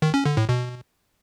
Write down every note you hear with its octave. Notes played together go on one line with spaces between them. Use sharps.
D#3
C#4
D3
A2
B2